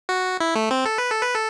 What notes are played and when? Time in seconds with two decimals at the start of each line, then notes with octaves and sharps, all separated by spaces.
0.09 F#4
0.41 E4
0.55 A3
0.71 C4
0.86 A4
0.98 B4
1.10 A4
1.22 B4
1.34 A4